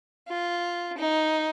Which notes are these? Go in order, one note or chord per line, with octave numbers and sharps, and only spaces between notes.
F4
D#4